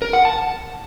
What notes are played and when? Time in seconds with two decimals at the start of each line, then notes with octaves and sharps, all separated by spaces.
0.02 A#4
0.13 F#5
0.25 A5